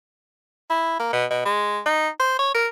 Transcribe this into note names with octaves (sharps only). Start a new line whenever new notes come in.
E4
A#3
B2
B2
G#3
D#4
C5
C#5
A#4